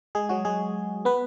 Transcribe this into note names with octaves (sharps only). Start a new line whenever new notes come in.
G#3 G#4
F#3 F#4
G#3 G#4
B3 B4